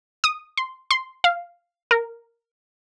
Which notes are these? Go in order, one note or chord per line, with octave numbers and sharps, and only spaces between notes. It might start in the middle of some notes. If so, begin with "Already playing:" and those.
D#6
C6
C6
F5
A#4